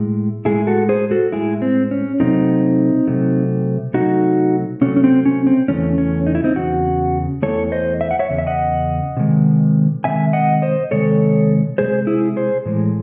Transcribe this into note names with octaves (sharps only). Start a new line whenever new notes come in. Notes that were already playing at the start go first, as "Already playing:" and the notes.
Already playing: A2 G#3
A2 G#3 E4 G#4
F#4 A4
G#4 C5
F#4 A4
A2 G#3 E4 G#4
C4
C#4
C3 F#3 A3 C4 D#4
C3 F#3 A3
C3 F#3 A3 D#4 F#4
C3 F#3 A3 C#4
C#4
C4
C#4
C4
E2 C#3 E3 A3 C#4
C#4
D#4
E4
C4 D#4
E2 C#3 F#4
E2 C#3 E3 A3 A4 C#5
C5 D#5
E5
F#5
C#5 E5
E2 C#3
E5
D#5 F#5
C3 D#3 G#3
C3 D#3 G#3 E5 G#5
D#5 F#5
C5 D#5
C3 D#3 G#3 A4 C#5
C3 D#3 G#3 G#4 C5
E4 G#4
G#4 C5
A2 E3 G#3